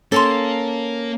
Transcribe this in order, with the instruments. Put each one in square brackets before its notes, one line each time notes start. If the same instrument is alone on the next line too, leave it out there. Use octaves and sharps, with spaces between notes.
[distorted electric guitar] A#3 [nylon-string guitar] C#4 [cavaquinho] A4 A5 C6